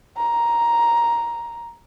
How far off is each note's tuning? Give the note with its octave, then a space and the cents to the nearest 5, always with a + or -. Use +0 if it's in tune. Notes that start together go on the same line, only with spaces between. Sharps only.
A#5 +5